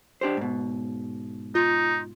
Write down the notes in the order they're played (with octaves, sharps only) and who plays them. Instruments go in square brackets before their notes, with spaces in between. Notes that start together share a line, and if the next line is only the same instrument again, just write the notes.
[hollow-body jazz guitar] D4 G4 C5
G#2 B2
[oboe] D#4 [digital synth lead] F4